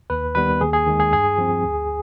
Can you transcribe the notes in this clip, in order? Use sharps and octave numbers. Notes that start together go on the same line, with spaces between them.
D#2 B4
D#3 G3 B3 B4
D#2 G#4
G#4
D#3 G#3
G#4
G2 G#4
F3 C4
D2